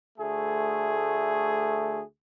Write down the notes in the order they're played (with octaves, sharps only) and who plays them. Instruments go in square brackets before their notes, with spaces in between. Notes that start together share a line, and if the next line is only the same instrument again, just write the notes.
[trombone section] D2 A3 G#4